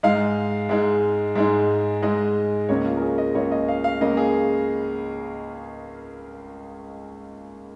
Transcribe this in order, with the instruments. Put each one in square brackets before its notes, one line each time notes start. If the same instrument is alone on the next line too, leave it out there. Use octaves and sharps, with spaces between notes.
[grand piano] G#2 G#3 D#4 F5
G#2 G#3 D#4
G#2 G#3 D#4
G#2 G#3 D#4 D#5
C#2 C#3 A#3 C#4 C#5
F4
A#4
G#4
D#5
C#2 C#3 A#3 C#4 C#5
D#5
F5
F5
C#2 C#3 A#3 C#4 D#5
G#4